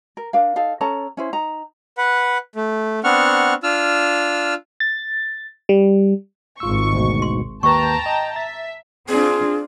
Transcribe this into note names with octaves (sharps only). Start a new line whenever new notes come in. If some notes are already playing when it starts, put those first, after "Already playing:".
A#4
D4 A#4 F5
D#4 A4 F5
C#4 A4 A5 A#5
C#4 E4 C5
D#4 A#5
B4 F#5
A3
B3 C4 D4 F#5 C#6 F6
D4 F4 E6 F6
A6
G3
G#1 F4 C#6 E6
D2 G#2 B2
C6
D#2 B4 G5 A5 A#5 C#6
D#5
E5 A6
C4 D4 F4 G#4